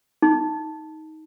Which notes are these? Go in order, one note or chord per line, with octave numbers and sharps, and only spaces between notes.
D#4